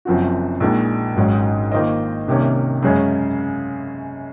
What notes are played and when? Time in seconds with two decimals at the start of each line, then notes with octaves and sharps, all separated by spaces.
0.05 F#1 F#2 F3 C4 F#4
0.60 A#1 A#2 G#3 D#4
1.16 G#1 G#2 F#3 C#4
1.72 D#3 A#3 F4 C5 D#5
2.28 C2 C3 D#3 A#3 C#4
2.82 F#2 C#3 G#3 C#4